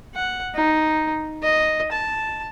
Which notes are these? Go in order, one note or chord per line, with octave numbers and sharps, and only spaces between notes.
F#5
D#4
D#5
A5